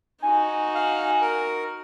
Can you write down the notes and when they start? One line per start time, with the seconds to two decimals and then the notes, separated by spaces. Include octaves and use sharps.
0.22 D#4 F#4 G#5
0.75 F5
1.21 A#4